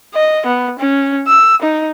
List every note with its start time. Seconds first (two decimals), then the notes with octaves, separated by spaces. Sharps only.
0.15 D#5
0.46 B3
0.79 C#4
1.28 E6
1.62 D#4